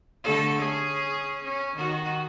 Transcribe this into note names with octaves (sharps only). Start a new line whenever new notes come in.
D3 A3 A4
C#4 G#4
C#4
D#3 F#4